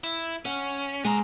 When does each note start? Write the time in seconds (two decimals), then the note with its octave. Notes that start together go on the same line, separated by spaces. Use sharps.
0.04 E4
0.45 C#4 F#5
1.05 G#3 B3 A#5